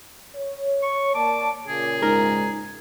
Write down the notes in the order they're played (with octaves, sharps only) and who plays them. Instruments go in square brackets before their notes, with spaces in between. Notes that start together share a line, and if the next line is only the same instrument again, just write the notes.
[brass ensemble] C#5
[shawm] C#6
[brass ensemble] A#3 D5 A5 [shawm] D6
[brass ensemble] A#2 C#3 [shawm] G#4
[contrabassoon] G#2 [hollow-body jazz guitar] A#4